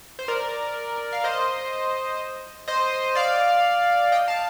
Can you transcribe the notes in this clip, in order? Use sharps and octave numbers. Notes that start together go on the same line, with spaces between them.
C5
A#4 D5
F5
C5 D#5
C5 D#5
D5 F5
D#5 G5
F5 A5